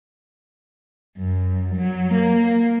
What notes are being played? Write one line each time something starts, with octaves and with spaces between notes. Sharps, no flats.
F#2
F#3
A#3